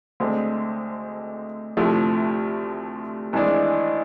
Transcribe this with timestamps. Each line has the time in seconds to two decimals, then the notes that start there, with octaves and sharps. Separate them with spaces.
0.20 D2 D3 G#3 C4
1.77 D2 C3 F3 A3 E4
3.33 G#1 G#2 E3 G#3 D4